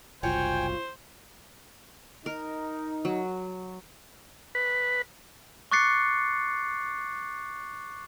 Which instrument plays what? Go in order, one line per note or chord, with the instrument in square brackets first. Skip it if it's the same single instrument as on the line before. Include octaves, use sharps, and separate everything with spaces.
[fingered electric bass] F#1 C2 [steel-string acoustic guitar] F4 F#4 C#5 [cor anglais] C5 [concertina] G5 G#5
[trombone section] D#4 [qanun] A#4
[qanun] F#3
[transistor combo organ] B4
[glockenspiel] C#6 D6 F#6 A6 C7 C#7